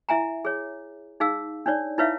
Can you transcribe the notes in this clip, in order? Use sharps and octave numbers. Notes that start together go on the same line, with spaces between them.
E4 E5 G#5 A#5
G#4 C#5
D#4 G#4 F5 E6
D4 D#4 C#5 D5
D#4 E4 B4 C#5 E5 F5